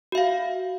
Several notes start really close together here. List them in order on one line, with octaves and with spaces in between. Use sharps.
F#4 E5 F5